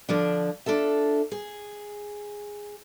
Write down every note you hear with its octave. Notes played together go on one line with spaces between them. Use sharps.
D3 F3 D4
D4 F4 A4 E5
G#4